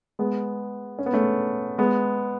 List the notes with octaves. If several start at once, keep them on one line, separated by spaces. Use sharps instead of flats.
G#3 B3
C#4
B3
A3 C#4
G#3 B3